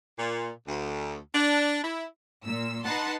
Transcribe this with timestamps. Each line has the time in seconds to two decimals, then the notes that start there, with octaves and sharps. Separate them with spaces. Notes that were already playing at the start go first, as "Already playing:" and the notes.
0.19 A#2
0.68 D2
1.35 D4
1.84 E4
2.43 A#2 E6
2.84 D#4 B4 F#5 A5 C6